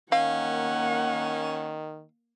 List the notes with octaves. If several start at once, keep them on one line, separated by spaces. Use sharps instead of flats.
D#3 A#3 C#4 F5 F#5